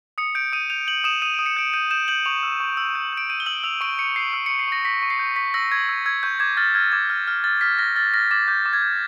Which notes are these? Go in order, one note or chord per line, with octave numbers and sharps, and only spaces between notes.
D#6 C#7
G6 D7
D#6 D#7
G6 F7
G6 F#7
D#6 E7
D#6 D#7
D7
D#6
C#7
G6 D7
G6 D#7
G6 E7
G6 F#7
C#6 F7
E6
C#6
E6
G6
G6 D7
G6 D#7
G7
E6 F#7
E6 F7
C#6 D7
C#6 C#7
C#6 C7
E6 C#7
C#7
C#6
C7
C#6 A#6
C#6 B6
C#6
C7
G6
C#6 B6
E6 A#6
C#6 G#6
E6
E6 G#6
C#6 G6
D6 G#6
F6 A6
F6 G#6
D6 G#6
F6
F6
F6 A6
F6 B6
F6 A#6
F6 A6
F6 A#6
D6 A6
D6 G6
D6
G#6
G6